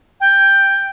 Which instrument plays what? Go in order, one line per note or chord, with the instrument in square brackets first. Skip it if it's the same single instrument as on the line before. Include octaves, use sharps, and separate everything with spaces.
[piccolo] G5